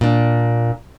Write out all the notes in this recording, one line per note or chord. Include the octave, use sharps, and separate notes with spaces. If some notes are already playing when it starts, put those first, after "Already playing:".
A#2 D4